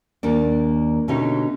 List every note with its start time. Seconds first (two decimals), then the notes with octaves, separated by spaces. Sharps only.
0.23 D#2 A#3 D4 D5
1.08 B2 D3 A3 C#4 D#4 G4